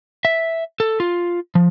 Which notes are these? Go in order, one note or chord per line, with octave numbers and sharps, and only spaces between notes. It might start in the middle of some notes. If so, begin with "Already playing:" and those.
E5
A4
F4
F3